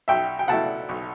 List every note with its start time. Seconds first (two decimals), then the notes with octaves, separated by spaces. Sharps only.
0.08 B1 E5 G5
0.39 G5
0.48 B2 A3 E4 F#5 A5
0.89 B1